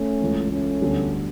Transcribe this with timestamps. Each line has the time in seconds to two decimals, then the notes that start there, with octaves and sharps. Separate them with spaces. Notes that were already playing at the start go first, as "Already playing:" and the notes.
Already playing: A3 C#4
0.20 C#2 C#3 E3
0.51 A3 C#4
0.82 D2 D3 G3 B3